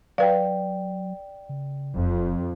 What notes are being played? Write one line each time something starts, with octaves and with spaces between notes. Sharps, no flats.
F#3 B4 D5 F5 G5
C#3
E1 F2